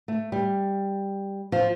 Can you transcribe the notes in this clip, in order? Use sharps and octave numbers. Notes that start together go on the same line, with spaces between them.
A3
G3
F3